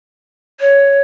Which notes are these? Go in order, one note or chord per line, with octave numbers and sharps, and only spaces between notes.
C#5